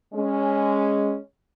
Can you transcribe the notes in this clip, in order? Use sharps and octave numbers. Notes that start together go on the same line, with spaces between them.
G#3 C#4